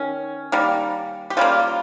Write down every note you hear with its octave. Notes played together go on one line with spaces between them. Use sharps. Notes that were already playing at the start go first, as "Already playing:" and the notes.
Already playing: D#3 C#4
D#3 G3 A#3
G4
C#3 G3 A#3 F4